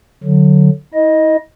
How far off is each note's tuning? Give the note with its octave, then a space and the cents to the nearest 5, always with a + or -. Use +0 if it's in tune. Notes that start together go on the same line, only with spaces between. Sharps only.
D3 +0 F#3 -10
E4 -40 D#5 +5